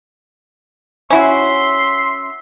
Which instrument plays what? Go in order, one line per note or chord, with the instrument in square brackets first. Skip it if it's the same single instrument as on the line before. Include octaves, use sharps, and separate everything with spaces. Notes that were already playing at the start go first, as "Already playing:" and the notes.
[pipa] C#4 E4 F#4 [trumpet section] E5 C6